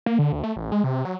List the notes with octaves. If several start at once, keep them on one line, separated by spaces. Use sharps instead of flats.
A#3
D3
D2
A3
A1
G#3
C3
F#3